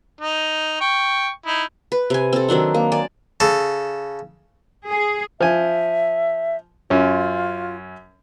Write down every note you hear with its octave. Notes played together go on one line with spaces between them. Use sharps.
D#4
G5 C#6
D#4 E4
B4
C3 G#5
C4 A4
D#3 F#3 D4 D#4
A#3
D5 G#5 A5
C#3 A4
G#4
F3 E5 G#5
F#2 C#4 F4